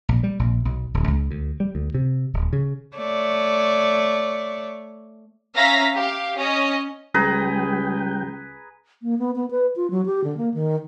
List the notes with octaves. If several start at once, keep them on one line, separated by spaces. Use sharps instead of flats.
A#1
G3
A#1
B1
D1
C#2
D2
G3
D2
C3
D1
C#3
A3 C#5 D5
C#4 E5 F5 A#5 A#6 B6
G4 F5
C#4 D#5
C#2 G3 G#4 B4 G5 A#5
A#3
B3
B3
B4
F4
F#3
G4
D3
A#3
D#3